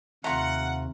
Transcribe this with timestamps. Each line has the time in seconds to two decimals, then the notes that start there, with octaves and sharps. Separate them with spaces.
0.24 D#2 C3 A3 F4 F#5 A#5 C#6